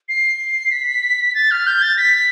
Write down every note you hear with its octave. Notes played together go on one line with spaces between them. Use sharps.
C7
B6
A6
F6
G6
A6
B6